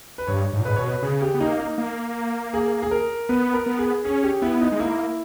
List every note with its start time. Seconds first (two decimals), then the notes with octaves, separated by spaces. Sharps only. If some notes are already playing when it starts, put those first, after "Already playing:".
0.18 B4
0.27 G2 C#5
0.53 G#2
0.60 A#2
0.65 G#2 B4
0.76 B2 C#5
0.87 B4
1.02 C#3 G#4
1.22 G4
1.35 B3
1.40 A#3 D#4
1.59 D#4
1.78 A#3
2.54 G#4
2.82 G#4
2.91 A#4
3.29 B3 B4
3.54 A#4
3.66 B3
3.79 G#4
4.04 C#4 G#4
4.23 G4
4.42 B3 E4
4.61 D#4
4.72 G#3
4.80 A#3 E4